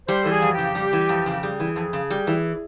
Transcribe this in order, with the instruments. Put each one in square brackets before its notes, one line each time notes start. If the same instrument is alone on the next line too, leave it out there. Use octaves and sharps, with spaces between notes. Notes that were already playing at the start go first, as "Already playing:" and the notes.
[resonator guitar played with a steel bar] G3 [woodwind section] C5
[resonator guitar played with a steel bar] E3 [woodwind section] A4
[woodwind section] G#4
[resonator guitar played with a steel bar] F2
[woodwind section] F#4
G4
[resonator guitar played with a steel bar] C#3
G3
E3
F2
C#3
[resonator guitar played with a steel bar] G3 [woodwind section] G#4
[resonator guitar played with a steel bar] E3
F2
C#3
G3
E3